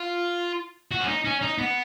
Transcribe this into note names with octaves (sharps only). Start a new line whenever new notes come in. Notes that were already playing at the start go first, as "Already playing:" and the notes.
Already playing: F4
F#4
C#4
D#4
C#4
D#4
B3